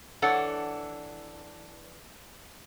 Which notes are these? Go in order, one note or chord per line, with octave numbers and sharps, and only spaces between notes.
E3 D4 A4 C#5 F#5